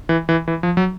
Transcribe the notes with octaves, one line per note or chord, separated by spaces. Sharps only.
E3
E3
E3
F3
F#3